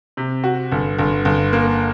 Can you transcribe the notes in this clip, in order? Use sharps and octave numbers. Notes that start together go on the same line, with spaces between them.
C3
F#4
G1
G1
G1
A#3